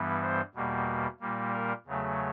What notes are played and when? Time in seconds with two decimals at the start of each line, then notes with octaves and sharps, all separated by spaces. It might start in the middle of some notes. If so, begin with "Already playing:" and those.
Already playing: G2 E3 G3 B3
0.22 C5
0.54 E2 B2 G3 A#3
1.20 A#2 G3 A#3
1.54 A#4
1.86 E2 C#3 F#3 A3